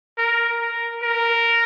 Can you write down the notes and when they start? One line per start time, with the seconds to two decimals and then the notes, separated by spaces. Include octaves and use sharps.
0.18 A#4
0.61 A#4
1.03 A#4